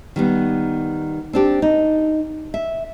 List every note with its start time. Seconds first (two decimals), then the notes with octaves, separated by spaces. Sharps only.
0.16 D#3 G3 B3
1.33 C4 D4 G4
1.62 D#4
2.54 E5